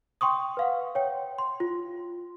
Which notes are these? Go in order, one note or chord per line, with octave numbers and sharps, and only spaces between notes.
G5 C6 C#6 D#6
B4 F5 F#5
C#5 G5
C6
F4